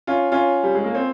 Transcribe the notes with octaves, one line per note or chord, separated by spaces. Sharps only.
C#4 F4
C#4 F4
G3
G#3
A#3
C4